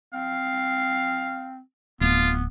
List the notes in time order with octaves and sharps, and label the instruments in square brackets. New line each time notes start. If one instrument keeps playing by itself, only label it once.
[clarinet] C4 [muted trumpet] F5
[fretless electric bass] D1 [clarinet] B3 [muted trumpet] F4